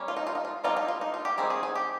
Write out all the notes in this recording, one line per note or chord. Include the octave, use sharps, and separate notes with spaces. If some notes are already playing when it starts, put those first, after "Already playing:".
Already playing: G3 A#3 C#4
F4
D#4
F4
D#4
F4
G3 A#3 D#4 F4
D#4
F4
D#4
F4
G4
D#3 G3 C4 D#4 G#4
G#4
G#4
G4